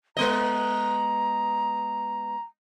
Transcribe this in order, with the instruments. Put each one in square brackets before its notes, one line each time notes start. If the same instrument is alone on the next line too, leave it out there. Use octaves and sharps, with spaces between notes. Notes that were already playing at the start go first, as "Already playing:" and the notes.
[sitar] G#3 B3 D#5 [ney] A#5